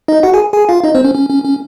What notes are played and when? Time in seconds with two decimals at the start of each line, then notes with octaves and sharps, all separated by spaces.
0.08 D#4 D#5
0.23 F#4 F#5
0.34 G#4 G#5
0.53 G#4 G#5
0.69 F4 F5
0.84 D#4 D#5
0.95 C4 C5
1.05 C#4
1.15 C#4
1.29 C#4
1.44 C#4